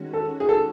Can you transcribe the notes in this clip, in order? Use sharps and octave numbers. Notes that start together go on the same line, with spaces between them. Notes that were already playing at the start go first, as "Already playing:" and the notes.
Already playing: D#3 G#3 C#4 F#4
A4
G#4
A4